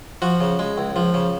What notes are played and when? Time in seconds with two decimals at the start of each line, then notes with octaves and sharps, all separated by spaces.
0.22 F3 F#4
0.41 C#3
0.59 G#3
0.78 C#2
0.96 F3
1.14 C#3